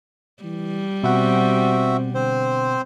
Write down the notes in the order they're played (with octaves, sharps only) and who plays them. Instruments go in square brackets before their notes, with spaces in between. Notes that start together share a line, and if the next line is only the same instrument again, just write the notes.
[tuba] E3 [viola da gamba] G3
[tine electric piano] B2 F#5 [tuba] C4 [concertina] F#4 E5
[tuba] D3 [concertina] C4 C5